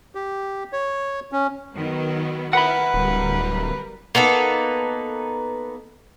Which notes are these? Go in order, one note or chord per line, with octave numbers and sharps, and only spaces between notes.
G4
C#5
C#4
D#3 F#3 B3
E4 A#4 B4 F#5 B5
D1 G3 A#4
A#3 B3 D#4 A4